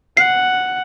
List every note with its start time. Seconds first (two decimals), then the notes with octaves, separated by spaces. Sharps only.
0.17 F#5 C7